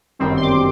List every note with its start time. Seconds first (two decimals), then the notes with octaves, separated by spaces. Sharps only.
0.19 G1 F#2 D#3 G3 C4
0.37 C6
0.42 D6